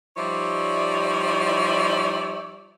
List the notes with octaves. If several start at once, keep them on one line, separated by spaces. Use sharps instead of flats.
F3 G3 D#4 C#5 D5 E5